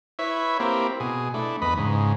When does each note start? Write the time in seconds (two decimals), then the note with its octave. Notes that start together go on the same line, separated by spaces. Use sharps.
0.19 E4 B4 C#5 E5
0.60 A#3 C4 E4 G4
1.00 B2 G#4
1.34 A3 D4 E4
1.62 E2 B4 D#5 B5
1.78 G#2 C#3